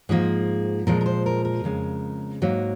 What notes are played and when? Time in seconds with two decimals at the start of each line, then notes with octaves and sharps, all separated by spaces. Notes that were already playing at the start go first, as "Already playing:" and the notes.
0.09 G#2 F3 A#3 G#4
0.87 A#2 F3 G#3 A#4
1.01 A#4
1.06 C5
1.26 A#4
1.45 A#4
1.64 F2 C#3 G#3
2.42 G#2 F#3 A#3